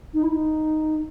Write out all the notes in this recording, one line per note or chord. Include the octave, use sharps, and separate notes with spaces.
D#4
E4
D#4